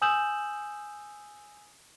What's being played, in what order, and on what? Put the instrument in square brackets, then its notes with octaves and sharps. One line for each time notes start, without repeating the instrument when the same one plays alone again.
[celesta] G#5 D#6 E6 G6 E7 F#7